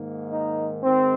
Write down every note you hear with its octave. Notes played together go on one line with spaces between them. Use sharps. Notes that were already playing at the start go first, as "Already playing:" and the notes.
Already playing: G#2 D#3 A#3
D#4
G#2 D#3 G#3 C4